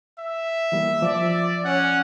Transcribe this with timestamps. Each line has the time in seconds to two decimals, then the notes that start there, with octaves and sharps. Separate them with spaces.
0.19 E5
0.72 E3 G3 A#3
1.02 F3 D5
1.65 C#4 F#5